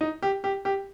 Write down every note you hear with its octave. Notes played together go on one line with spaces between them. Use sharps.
D#4
G4
G4
G4